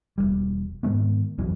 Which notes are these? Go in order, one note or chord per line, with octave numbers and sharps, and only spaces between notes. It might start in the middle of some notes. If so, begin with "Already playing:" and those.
E1 C#2 G3
G#2 D#3 G#3 B3
B1 F2 E3 F#3